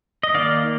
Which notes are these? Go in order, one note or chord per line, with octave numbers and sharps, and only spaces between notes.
D#5
D#3 A#3 D5 F5